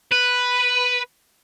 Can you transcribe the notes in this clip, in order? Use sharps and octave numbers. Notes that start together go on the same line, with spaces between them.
B4